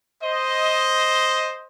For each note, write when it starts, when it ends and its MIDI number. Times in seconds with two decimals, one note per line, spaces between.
0.22 1.67 72
0.22 1.67 75